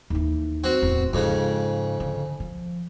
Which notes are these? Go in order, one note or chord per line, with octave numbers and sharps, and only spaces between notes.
D#2 E3
C4 F#4
D1 E2
F2 G#2 C#3
D3
F3